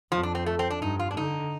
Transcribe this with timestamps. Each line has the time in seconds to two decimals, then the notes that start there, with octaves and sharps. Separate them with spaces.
0.12 F2 F3
0.23 D4
0.35 C4
0.46 A3
0.59 C4
0.70 D4
0.81 G2 D#4
0.99 F4
1.11 D4
1.17 D3 D#4